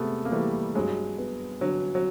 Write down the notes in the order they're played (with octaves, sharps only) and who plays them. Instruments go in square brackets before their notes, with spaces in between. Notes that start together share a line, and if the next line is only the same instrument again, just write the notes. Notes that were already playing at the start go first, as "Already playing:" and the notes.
Already playing: [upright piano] C3 G#3 [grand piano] A3 B3
[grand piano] A#3
[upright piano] E3 [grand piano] G3 A3
[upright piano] G2 [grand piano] F#3 G#3
[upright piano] B3
[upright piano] D3 [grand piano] F#3
[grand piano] F#3